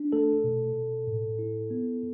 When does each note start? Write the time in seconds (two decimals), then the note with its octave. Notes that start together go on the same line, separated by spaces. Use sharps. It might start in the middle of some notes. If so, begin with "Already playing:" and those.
Already playing: D4
0.12 A3 A4
0.44 B2
0.76 B2
1.07 A2
1.39 E4
1.70 B3